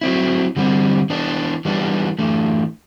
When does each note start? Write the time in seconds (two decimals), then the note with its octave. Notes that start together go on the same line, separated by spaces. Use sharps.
0.01 F#3 C4 E4
0.56 D3 G3 C4
1.10 E3 B3 D4
1.65 E3 G3 B3 D4
2.18 E3 A3 D4